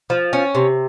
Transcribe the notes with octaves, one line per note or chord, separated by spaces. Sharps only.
F3
C#4
C3